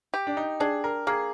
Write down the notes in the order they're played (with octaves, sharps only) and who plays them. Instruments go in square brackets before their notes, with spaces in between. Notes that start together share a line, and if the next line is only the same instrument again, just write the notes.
[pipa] G4
[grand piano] D4
D#4
[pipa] D4 [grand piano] G#4
[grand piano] A#4
[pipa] A#3 [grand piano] G#4